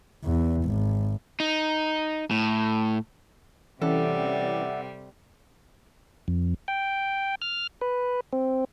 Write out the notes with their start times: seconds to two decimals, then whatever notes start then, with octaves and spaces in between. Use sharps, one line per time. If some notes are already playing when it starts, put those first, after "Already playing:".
0.24 E2
0.64 G#1
1.40 D#4
2.31 A2
3.82 C3 E3 G3 C#4 A4 D5 E5 F#5
6.28 F2
6.68 G5
7.42 F6
7.81 B4
8.33 C4